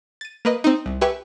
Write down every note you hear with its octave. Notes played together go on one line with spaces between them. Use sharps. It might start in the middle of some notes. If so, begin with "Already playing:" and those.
A6 D#7
A#3 B4 D#5
C4 D#4
C2
G4 B4 E5 G5 G#5 C#6